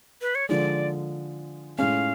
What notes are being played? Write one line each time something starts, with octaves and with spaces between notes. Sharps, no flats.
B4
C#5
D3 F3 G#3 D5
A2 G#3 C#4 F5